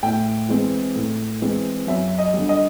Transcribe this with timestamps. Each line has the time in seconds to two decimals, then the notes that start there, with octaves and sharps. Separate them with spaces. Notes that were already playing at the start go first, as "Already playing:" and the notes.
0.03 A2 G5
0.48 E3 G#3 C4
0.96 A2
1.42 E3 G#3 C4
1.87 F#2 E5
2.18 D#5
2.34 D3 G3
2.49 D#5